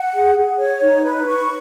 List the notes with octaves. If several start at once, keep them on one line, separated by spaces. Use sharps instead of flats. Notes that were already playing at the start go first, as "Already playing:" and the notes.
Already playing: F#5
G#4
G#4
C#5
D#4
B4
C#6